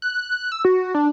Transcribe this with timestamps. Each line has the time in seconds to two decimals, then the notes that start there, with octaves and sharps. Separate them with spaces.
0.02 F#6
0.52 E6
0.65 F#4
0.94 D4